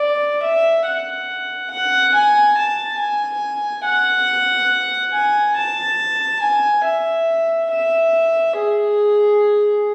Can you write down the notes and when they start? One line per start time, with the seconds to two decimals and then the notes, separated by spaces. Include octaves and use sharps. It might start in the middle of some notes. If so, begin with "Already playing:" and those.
Already playing: D5
0.42 E5
0.86 F#5
1.70 F#5
2.15 G#5
2.57 A5
2.99 G#5
3.85 F#5
5.13 G#5
5.56 A5
6.42 G#5
6.85 E5
7.71 E5
8.57 G#4